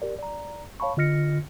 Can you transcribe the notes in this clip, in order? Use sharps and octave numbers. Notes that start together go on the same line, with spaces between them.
G4 A#4 D5
D5 A#5
C#5 F5 A5 B5 C#6
D3 F4 D#5 F6 A#6 C#7